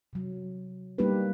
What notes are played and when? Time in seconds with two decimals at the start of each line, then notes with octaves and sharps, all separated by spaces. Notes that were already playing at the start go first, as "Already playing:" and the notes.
0.13 C3 F#3
0.98 G3 A#3 D4 D#4 G4 B4